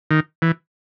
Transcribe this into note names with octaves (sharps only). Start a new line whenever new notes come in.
D#3
E3